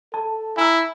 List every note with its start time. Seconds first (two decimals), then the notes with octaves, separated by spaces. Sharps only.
0.14 A4 A5
0.57 E4 G#5 A#5 E6